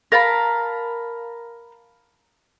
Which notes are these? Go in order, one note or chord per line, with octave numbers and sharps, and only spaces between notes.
A#4 F5 A5 B5